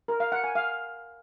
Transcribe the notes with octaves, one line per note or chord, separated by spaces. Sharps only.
A#4
F5
F#5
G#5
F5